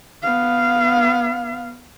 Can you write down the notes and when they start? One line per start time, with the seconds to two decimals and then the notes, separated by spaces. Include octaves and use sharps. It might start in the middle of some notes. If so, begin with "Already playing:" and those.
0.23 B3 F5